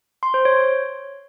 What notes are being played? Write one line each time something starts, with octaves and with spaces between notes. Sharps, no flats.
C6
C5
C#5